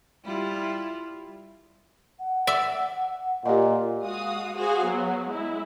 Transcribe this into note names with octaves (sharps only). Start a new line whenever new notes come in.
G3 E4 F4
F#5
D5 E5
A#2 G4 D#5
G#3 F#4 F5 D#6
F#4 G#4 C5 F5
F#3 B3
G#3 E4